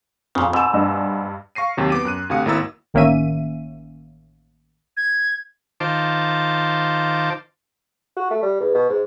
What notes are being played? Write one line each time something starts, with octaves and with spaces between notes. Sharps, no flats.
F2 A#2 C#3
G#2 B2 E6 E7
G2 D4 D#5
F5 C#6 A#6 C7 D#7
D#2 C3 F#3
B3 D6 D#7
F#2 F#6 D#7
D2 C3 F5 D#6 C#7
G#1 A#3 E4 A#5 E6 A6
A1 D#3 A#3 C#4 E5 D#7
G#6
D#3 F4 C5 A5 D6
F#4
A3
G3
E2
B2
G#2